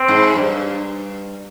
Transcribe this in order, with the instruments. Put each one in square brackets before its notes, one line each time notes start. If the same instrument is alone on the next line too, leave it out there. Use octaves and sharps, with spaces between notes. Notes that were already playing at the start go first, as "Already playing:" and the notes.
Already playing: [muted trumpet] C4
[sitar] G#2
G2